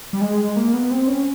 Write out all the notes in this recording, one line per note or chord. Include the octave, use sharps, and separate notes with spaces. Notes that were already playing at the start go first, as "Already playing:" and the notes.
G3
G#3
A#3
B3
C4
C#4